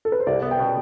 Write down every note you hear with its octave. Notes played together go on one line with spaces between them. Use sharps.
A4
B4
C5
C2 D5
B3
G5
B2